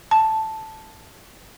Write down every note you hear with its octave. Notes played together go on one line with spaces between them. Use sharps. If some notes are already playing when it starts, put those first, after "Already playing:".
A5